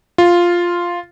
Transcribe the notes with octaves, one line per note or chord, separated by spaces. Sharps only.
F4